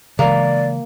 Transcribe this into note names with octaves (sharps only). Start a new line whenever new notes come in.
C#3 E3 G#3 A#3 D5